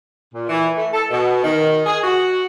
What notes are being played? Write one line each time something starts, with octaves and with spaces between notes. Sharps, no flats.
A#2
E3
A3
A4
B2
D#3
G#4
F#4